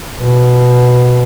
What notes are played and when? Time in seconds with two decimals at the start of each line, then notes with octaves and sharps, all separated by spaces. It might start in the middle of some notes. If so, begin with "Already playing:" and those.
0.19 B2